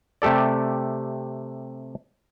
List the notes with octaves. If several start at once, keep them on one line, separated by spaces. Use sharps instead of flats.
C3 A3 G4 A4 D5